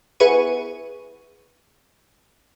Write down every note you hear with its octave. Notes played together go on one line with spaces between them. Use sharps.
B3 E4 G#4 B4 C#6 D#7